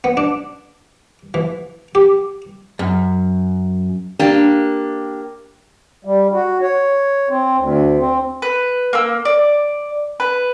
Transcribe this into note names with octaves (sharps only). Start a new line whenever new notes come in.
B3
D4
E3
G4
F#2
A#3 D4 G4
G3
F#4
C#5
C4
D2
C4
B4
A#3 E6
D5
B4